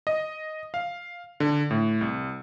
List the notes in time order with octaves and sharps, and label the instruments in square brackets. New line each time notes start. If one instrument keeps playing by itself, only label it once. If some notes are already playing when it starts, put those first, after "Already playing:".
[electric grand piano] D#5
F5
D3
A2
C2